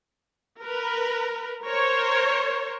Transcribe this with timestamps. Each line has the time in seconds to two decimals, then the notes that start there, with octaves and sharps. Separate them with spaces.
0.62 A#4 B4
1.65 A#4 C5 C#5